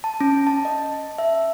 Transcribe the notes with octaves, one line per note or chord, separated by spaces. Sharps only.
A5
C#4
A5
D#5
E5